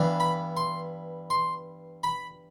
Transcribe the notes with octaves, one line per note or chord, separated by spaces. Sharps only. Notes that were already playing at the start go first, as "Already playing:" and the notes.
Already playing: G2 E3 B3 D4
B5
C6
C6
B5